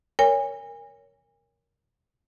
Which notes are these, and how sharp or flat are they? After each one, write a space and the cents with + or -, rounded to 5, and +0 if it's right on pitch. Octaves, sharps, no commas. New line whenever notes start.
A#4 +0 C#5 +15 G#5 -35